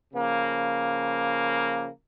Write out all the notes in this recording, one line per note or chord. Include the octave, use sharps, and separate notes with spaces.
C#3 F3 A#3